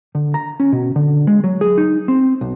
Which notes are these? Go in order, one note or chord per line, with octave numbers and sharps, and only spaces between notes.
D3
A#5
C#4
B2
D3
G#3
F#3
G#4
D#4
C4
B1